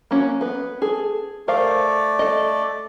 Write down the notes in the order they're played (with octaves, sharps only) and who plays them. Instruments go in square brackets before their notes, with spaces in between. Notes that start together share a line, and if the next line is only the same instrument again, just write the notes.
[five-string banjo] A#3 C#4 F#4
B3 B4
G#4 A4
[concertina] A3 D5 [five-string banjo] A#4 C5 F5
[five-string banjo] A4 D#5